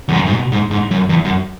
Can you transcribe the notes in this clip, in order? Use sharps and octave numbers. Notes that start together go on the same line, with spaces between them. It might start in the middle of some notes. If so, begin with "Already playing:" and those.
E2
F#2
G#2
B2
G#2
G#2
F#2
E2
F#2